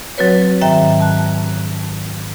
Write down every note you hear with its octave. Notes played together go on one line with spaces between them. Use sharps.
F#3 C4 F#4 B4 C#5
G#2 D#3 E5 G5 A#5
A5 F#6